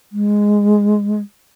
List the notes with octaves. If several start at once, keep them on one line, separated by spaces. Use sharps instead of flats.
G#3